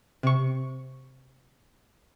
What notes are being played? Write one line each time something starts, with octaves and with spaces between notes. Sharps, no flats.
C3 C#6